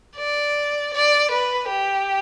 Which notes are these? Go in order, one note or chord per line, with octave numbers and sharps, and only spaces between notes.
D5
D5
B4
G4